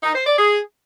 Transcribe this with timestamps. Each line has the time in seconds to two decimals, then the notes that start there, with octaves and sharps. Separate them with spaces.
0.03 D#4
0.15 C5
0.27 D5
0.39 G#4